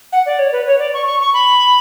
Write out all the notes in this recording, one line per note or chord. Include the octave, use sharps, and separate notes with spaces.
F#5
D5
C#5
B4
C#5
D5
C#6
C#6
C#6
B5